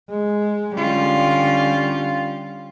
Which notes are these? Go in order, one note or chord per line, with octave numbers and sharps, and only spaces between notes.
G#3
D3 G3 C#4 F4